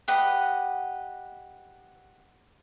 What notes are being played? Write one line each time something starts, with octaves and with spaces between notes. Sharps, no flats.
G4 B4 D#5 F#5